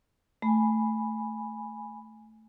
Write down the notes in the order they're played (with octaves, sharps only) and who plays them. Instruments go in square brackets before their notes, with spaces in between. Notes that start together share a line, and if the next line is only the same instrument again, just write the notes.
[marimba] A3 [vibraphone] G#5 B5